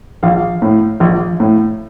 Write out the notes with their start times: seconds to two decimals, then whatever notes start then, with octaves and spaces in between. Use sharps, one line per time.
0.23 A#1 F5
0.62 A2
1.00 A#1
1.40 A2